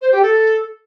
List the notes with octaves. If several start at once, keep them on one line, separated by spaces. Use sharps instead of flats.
C5
G4
A4